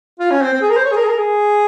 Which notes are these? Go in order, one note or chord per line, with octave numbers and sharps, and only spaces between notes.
F4
C#4
C4
C4
G#4
A#4
C5
C#5
G#4
A#4
G#4
A#4
G#4